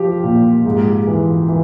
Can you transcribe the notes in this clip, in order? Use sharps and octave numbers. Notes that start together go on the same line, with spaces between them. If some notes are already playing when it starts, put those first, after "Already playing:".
Already playing: F3 G4
A#2
G#2
E3
E3